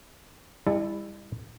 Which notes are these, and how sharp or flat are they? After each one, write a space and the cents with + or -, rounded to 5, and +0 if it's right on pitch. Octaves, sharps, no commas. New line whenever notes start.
G3 +40 E4 +0 A5 -10